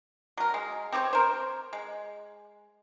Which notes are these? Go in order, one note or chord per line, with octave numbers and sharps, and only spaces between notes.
F#3 A#4
G#3
C4 G4 C5 C#5
A#4 C5
G#3